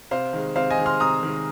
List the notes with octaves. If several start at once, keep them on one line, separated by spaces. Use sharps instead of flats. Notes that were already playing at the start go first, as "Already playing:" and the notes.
C3 C5 F5
D#3 G#3
C3 C5 F5
D#5 G#5
D#3 G#3
C6 F6
C3 A#5 D#6
D#3 G#3